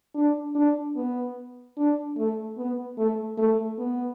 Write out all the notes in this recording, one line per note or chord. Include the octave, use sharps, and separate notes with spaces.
D4
D4
B3
D4
A3
B3
A3
A3
B3